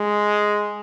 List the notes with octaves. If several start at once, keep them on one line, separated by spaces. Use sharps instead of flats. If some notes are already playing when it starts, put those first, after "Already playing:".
Already playing: G#3